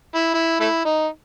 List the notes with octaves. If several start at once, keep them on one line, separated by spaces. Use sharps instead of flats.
E4
E4
A3 E4
D#4